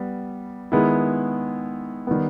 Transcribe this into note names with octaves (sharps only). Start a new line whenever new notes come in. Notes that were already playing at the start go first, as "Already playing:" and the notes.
Already playing: G3 B3
D#3 G#3 B3 E4
D#3 G3 B3